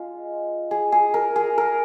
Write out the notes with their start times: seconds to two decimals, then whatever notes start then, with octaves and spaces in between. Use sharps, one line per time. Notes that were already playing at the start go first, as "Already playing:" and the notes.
Already playing: G#3 F4
0.71 G#4
0.92 G#4
1.14 A#4
1.36 G#4
1.58 A#4